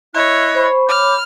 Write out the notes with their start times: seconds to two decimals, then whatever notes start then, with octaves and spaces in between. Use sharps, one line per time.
0.14 E4 C#5 D#5 F#6
0.55 C5 B5 C#6
0.89 C#5 B5 D6 F6 G6